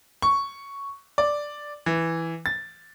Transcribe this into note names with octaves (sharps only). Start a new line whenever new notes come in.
C#6
D5
E3
A6